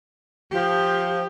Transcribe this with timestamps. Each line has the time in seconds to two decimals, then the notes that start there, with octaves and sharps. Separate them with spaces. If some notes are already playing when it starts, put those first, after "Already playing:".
0.52 F3 G4